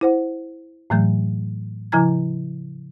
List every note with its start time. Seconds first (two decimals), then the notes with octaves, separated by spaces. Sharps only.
0.01 E4 C5 F#5
0.90 A2 E3 F#3 A3 G6
1.92 C#3 F3 E4 G#5 A#5 G#6